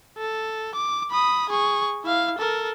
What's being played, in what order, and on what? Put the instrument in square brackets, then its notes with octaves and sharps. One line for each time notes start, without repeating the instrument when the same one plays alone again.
[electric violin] A4
D6
B5 D#6
G#4 C#6
E4 F5
A4 A#4